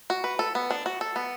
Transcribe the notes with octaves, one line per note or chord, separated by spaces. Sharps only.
F#4
B4
A4
B3
D4
F#4
A4
B3